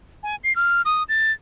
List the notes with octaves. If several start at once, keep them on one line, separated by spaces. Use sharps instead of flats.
G#5
C7
F6
D#6
A6